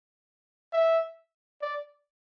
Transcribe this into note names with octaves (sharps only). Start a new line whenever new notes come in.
E5
D5